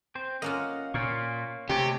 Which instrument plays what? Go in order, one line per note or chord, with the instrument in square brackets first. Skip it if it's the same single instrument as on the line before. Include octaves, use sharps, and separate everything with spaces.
[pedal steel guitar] C4 C5
[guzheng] A#3 C#4 F4 [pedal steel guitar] D#5 F5 F#5
[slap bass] A#2 [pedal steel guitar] C#5 F5 C#6
[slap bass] C3 [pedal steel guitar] G#3 A3 C#5 [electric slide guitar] G4